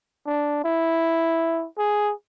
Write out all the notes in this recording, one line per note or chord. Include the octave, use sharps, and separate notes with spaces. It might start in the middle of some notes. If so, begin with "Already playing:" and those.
D4
E4
G#4